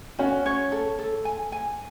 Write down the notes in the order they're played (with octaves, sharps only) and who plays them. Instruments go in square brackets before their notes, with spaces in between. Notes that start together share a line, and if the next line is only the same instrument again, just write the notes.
[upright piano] C#4 [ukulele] F#4
[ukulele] C#5
A4
A4
G#5
G#5